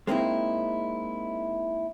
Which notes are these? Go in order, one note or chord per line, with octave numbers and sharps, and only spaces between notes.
G#3 A#3 C4 C#4 D#4 E4